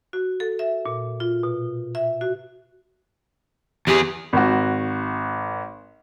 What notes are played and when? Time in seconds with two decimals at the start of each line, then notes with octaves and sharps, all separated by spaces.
0.13 F#4
0.40 A4
0.59 E5
0.86 A#2
1.20 F4
1.43 B2
1.95 E5
2.21 F#4
3.87 E2 G4 G#4
4.33 G#1 F#4